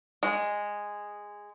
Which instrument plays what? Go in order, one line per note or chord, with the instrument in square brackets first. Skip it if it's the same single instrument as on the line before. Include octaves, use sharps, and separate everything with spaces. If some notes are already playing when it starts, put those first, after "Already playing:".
[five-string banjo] G#3